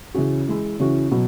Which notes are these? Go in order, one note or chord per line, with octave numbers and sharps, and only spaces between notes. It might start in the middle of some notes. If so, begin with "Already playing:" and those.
C#3 E3 C#4 F#4
E3 G#3 E4 G#4
C#3 E3 C#4 F#4
B2 F#3